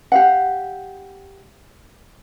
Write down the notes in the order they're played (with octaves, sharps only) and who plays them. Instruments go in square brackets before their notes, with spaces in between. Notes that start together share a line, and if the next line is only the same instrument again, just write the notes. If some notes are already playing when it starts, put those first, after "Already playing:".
[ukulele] G4 F5 F#5